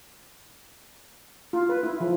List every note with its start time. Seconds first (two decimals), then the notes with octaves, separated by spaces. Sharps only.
1.53 F4
1.69 B4
1.83 E4
2.00 F3